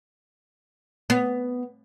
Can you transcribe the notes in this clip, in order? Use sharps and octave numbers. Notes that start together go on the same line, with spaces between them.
B3